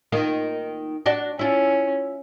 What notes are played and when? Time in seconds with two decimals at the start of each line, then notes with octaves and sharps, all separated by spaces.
0.12 D#3 A#3 F4
1.06 D4 F#4 D5
1.39 C#4 E4 F4